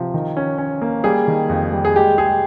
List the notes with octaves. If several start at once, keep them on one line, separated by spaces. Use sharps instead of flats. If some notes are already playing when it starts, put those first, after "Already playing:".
Already playing: C3 F3
D#3
C#4
C#4
A#3
G3 G#4
D#3
F2
G3
G#4
G#3 G4
G#3 G#4